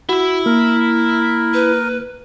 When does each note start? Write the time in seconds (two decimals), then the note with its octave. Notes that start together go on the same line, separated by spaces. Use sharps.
0.09 E4 F#4 E5
0.46 A#3 A#4
1.54 B4